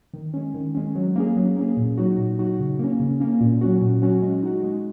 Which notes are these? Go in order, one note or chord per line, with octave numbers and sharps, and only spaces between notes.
D#3
G#3 C#4
D#3
G#3 C#4
F#3
A#3 C#4 G#4
F#3
A#3 C#4 G#4
A#2
F#3 D#4 F#4
A#2
F#3 D#4 F#4
C#3
A#3 C#4
C#3
A#3 C#4
A#2
F#3 C#4 F#4
A#2
F#3 C#4 F#4
G#3
D#4 F#4
G#3